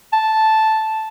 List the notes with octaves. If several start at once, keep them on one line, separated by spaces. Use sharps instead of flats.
A5